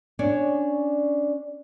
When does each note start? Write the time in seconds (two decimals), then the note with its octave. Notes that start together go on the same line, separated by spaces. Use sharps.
0.19 C#4 D4 C#5 D5